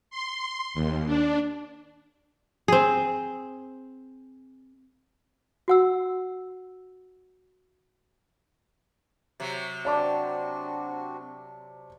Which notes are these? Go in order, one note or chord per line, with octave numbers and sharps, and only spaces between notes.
C6
D#2
D4
C4 G#4
F#4 F#5 E6
C3 F#3
C4 D4 F#4 D5 A5 D6